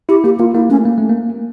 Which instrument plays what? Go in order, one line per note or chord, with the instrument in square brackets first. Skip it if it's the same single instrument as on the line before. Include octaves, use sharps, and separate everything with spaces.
[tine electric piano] E4 [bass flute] G4
[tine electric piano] A#3 [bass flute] G4
[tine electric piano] A#3 [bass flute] F4
[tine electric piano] A#3 [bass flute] E4
[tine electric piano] A3 [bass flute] C#4
[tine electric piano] A#3
A3
A#3